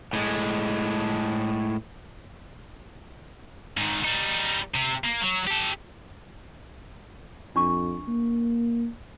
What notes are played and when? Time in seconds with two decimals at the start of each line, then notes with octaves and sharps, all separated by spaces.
0.13 A2 G#3
3.77 G#2 D#3
4.05 G3 D#4
4.74 C3
5.04 A#3
5.21 F#3
5.47 G4 A4
7.56 F2 D4 C#6
8.08 A#3